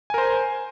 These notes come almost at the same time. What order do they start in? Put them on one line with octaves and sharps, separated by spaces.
G#5 A#4 C5